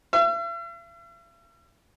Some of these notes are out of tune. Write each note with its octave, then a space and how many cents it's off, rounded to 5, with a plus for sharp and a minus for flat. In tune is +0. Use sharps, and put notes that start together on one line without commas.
E5 +45